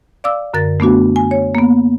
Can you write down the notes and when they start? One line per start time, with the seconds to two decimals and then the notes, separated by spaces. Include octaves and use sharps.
0.24 D5 F5 D6 E6
0.54 F#2 D3 A#4 A6
0.80 A3 B3 D4 F#4
1.16 G#5
1.31 C#5
1.55 A#3 B3